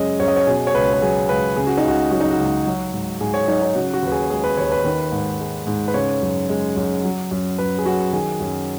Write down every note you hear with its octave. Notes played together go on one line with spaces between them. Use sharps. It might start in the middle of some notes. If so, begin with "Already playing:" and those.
Already playing: F#2 C#3 G#3 C#5 D#5
F#2 C#5
D#5
C#5
B2 G#4
C#5
C#2 B4
B4
F#3 G#4
C#2 B4
C#3 G#4
F#4
D#4
C#2 F#4
F#3 F#4
D#4
F#4
C#2
F#3
G#2
G#2 G#4
C#5
F#3 D#4
D#4
C#3 F#4
F#4
D#2 B4
G#4
G#3 G#4
B4
D#2 C#5
B4
D#3
G#2
G#3
G#2
B4
C#3 C#5
F#2
G#3
F#2
F#3
F#2
F#2 B4
G#4
F#3 F#4
D#3 G#4
F#2